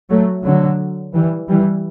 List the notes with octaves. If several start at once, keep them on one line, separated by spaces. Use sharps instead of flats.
F#3 A3
D3 F#3
E3 G3
E3 G3